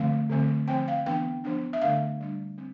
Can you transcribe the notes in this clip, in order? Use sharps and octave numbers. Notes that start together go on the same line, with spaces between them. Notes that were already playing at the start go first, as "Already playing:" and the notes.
Already playing: D3 F3 A3 C4 F5
D3 F3 A3 C4
F3 C4 G5
F5
E3 B3 D4 G5
F3 B3 D4
E5
D3 A3 D4 F5
G3 D4
C4